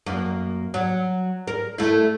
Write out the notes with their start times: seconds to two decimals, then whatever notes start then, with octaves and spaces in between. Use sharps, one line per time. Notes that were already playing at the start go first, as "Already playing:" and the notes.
0.06 F#2 A#3
0.74 F#3
1.47 A#4
1.78 A3 E4